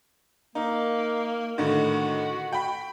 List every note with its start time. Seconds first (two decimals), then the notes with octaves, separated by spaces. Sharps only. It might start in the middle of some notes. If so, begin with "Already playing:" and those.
0.55 A#3 D#4
1.58 A2 D3 D#3 F#4
2.52 G5 B5